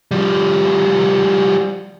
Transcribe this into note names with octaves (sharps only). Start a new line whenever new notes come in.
F3 G3